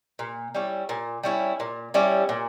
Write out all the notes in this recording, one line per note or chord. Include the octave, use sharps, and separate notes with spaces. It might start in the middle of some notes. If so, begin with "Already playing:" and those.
A#2
G3 C#4 E4
A#2
G3 C#4 E4
A#2
G3 C#4 E4
A#2